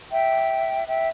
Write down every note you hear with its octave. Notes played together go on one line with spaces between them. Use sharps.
E5 G5
E5 G5